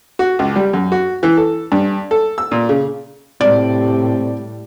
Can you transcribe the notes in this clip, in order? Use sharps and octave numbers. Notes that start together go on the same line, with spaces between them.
F#4
C#2
G3
F#2
F#4
E3
A4
G2
A4
E6
A#2
C#3
A2 C3 G3 D5